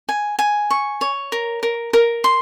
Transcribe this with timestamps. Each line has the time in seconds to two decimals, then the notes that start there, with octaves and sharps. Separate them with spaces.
0.09 G#5
0.39 G#5
0.71 C#6
1.01 C#5
1.32 A#4
1.63 A#4
1.93 A#4
2.24 C6